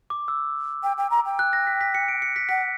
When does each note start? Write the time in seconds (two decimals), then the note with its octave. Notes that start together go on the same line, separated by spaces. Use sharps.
0.10 D6
0.28 E6
0.83 G5
0.98 G5
1.11 A#5
1.26 G5
1.39 F#6
1.53 A#6
1.67 B6
1.81 B6
1.95 C#7
2.08 D7
2.22 C#7
2.36 B6
2.49 F#5 B6